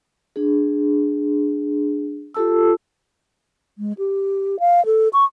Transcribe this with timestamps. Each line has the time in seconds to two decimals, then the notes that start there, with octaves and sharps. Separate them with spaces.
0.36 D4 G#4
2.34 F4 G4 A4 A5 E6
3.78 G#3
3.98 G4
4.60 F5
4.86 A4
5.13 C#6